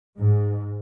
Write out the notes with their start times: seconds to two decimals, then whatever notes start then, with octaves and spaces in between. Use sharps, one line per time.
0.17 G#2